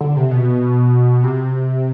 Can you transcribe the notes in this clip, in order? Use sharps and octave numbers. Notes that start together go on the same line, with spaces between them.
D3
C3
B2
C3